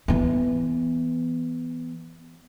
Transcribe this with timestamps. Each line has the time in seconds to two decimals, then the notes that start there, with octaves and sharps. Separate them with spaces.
0.08 E3 B3